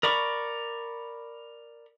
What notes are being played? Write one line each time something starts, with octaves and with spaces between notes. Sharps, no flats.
A#4 D5 B5 C#6